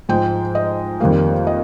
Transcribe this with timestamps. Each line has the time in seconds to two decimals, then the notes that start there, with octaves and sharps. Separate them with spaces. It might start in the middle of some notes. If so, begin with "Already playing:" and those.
0.09 G#2 F3 G#3 G5
0.55 D#5
1.00 F2 D#3 G3 A#3 F5
1.47 D#5